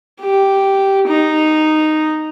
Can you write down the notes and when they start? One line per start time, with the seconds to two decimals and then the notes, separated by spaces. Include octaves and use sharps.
0.21 G4
1.07 D#4